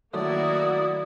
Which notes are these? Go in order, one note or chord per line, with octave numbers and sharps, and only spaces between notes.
D#3 F#3 A3 A#3 E4 F#4 D5 D#6